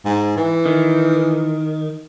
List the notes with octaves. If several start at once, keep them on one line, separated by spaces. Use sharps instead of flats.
G#2
E3
D#3